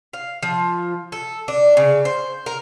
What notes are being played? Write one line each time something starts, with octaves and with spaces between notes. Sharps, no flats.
F5
F3
A4
D4
C#3
C5
A#4